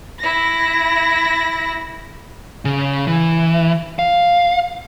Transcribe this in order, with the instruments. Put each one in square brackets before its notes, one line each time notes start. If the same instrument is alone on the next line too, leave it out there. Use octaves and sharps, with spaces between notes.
[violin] E4 A#6
[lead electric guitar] C#3
E3
F5